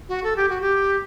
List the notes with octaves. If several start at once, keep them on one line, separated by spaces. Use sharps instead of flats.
F#4
A4
G4
F#4
G4